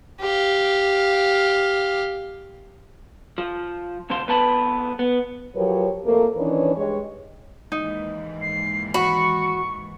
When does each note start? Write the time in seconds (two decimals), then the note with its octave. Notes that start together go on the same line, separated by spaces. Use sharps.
0.21 G4 F5
3.38 F3
4.10 D2 C3 F3 C5 C6
4.27 F2 B3 B4 A5 B5
4.99 B3
5.55 F3 F#3 G4 A#4 B4 C#5
6.04 F2 A3 A#3
6.37 D#3 E3 C#4 D4 B4 C#5
6.76 G2 G#3 G4 C#5
7.72 D#2 G#2 E3 D#4
8.42 C7
8.94 F#4 B5 C#6